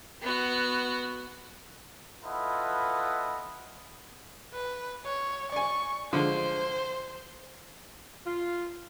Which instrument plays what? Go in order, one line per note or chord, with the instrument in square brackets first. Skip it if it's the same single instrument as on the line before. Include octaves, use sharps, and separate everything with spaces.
[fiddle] B3 F#4
[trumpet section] E4 F4 A4 B4 D#5 F#5
[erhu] B4
C#5
[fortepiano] D5 G#5 [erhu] C#6
[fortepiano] D3 F3 G#3 [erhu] C5
[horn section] F4